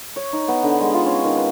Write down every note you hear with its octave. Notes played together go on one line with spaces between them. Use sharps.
C#5
D#4
B3
D3
G#3
F4
C#4
D#3
B4